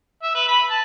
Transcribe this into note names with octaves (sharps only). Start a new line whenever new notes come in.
E5
B4
B5
A5